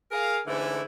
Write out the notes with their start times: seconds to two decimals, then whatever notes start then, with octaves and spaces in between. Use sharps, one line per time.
0.12 G#4 A#4 F5
0.46 G#2 D3 E3 A3 C#4 E4